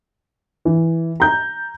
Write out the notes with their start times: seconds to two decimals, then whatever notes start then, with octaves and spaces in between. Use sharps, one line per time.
0.65 E3
1.20 A#5 G6